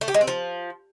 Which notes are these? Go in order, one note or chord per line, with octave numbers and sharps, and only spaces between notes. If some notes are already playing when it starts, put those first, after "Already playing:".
A3
G4
G#3
C4
F3